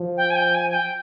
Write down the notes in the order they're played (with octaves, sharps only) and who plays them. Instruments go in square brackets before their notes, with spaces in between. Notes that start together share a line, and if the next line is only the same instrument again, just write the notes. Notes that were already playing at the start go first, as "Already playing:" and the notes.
Already playing: [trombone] F3
[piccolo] G5
G#5
G5
G#5
G#5
G5